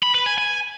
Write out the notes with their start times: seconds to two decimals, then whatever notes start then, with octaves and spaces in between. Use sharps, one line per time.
0.03 B5
0.14 B4
0.26 G#5
0.38 G#5